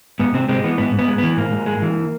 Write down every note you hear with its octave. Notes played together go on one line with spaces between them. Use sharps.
G#2 B3
G#2 C3 C4
C3 G#3 C4
E3 B3
G#2 B3
G#2
B3
G#3
E3 B3
G#2 A#3
G#2
G#3
E3